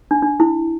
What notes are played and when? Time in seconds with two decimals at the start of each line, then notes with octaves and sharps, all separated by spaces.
0.11 D4
0.23 D4
0.40 E4